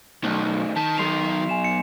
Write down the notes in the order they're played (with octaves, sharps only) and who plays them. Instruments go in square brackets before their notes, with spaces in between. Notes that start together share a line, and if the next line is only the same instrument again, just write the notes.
[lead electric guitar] B1 [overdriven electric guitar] D#3 A3
[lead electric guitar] D#3 [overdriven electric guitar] A5 [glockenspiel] B6
[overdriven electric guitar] F#3 B3 [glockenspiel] C6 C7 F7
[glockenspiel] G#5 E7
C#7